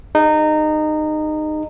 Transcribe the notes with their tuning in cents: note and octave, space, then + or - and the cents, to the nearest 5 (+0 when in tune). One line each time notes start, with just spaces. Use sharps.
D#4 -20 G#4 -20